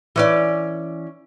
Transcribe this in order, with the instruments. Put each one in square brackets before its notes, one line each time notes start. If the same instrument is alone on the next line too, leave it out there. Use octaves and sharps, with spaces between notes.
[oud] E3 C#4 D5